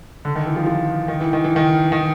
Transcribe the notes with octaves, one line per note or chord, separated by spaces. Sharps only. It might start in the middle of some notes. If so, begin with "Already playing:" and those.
D3
D#3
E3
F3
F3
D#3
E3
D#3
E3
D#3
D#3